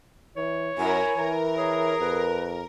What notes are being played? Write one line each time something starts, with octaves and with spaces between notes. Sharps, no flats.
E3 C#5
F#2 E4 A#4 G#5
E3 A#4
G#4 C#5
F2 B4